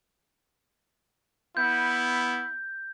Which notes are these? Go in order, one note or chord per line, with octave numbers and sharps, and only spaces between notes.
B3 E4 G6